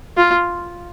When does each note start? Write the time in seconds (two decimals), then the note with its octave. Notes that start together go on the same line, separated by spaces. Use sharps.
0.17 F4